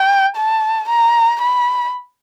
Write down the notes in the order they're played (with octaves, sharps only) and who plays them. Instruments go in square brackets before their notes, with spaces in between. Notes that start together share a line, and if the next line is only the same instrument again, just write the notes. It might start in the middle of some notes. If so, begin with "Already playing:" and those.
Already playing: [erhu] G5
A5
A#5
B5